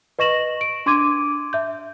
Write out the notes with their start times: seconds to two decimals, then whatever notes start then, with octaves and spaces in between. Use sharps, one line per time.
0.19 B4 D#5 C#6 A#6 E7 F#7
0.61 D7
0.86 D4 C6 D6 G#6 D#7
1.53 E5 G6